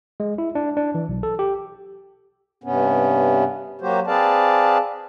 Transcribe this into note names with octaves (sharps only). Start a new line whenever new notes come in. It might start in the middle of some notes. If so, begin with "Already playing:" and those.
G#3
E4
D4
D4
E3
B1
A4
G4
G2 C3 B3 C#4
F#3 A#3 F#4 G4 C5
C4 G#4 B4 D5 F5 A5